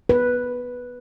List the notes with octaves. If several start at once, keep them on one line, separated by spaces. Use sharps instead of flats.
B4